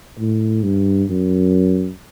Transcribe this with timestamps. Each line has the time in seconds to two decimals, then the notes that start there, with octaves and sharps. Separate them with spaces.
0.19 A2
0.63 G2
1.09 F#2